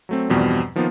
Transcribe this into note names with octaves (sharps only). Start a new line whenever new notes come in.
F#3 A3 C4
E2 G2 B2 F3 G3 C4
D#3 F3 A#3 B3 D#4 F4